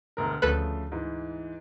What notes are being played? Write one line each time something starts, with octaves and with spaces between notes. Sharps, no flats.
E1 D2 A#4
D2 C#3 F3 A3 A4 B4
G#2 E3